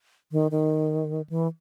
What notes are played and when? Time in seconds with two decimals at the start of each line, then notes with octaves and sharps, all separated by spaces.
0.32 D#3
0.51 D#3
1.30 E3